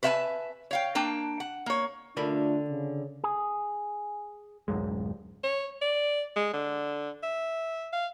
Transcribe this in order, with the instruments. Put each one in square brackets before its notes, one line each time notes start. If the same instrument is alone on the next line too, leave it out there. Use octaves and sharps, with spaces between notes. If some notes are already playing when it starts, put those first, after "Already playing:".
[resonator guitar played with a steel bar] B4 C5 E5 F5 G#5 A5
C#5 F5 G5
A#3 D4 G5 A5
F#5
A#3 C#5
[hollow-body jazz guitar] D3 A#4 B5 [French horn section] A3 D4 F4
[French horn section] C#3
[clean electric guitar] G#4
[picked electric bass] D1 F#2 G#3
[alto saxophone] C#5
D5
G#3
D3
E5
F5